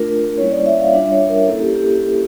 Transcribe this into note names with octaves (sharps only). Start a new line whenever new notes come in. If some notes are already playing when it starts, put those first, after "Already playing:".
Already playing: A3 D4 F4 A#4
G3 A#3 C#4 E4 C#5
D5
E5
F5
G3 D4 F4 E5
C#5
A#4
A#3 C#4 E4 A4
G4
G4